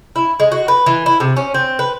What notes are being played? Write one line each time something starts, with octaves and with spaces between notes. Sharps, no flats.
E4
G#3
F#4
B4
E3
E4
C3
C#4
C4
B4